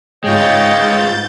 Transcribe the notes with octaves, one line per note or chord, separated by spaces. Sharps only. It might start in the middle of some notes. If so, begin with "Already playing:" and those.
G#2 G#3 F4 C#5 D#5 G5 G6 A6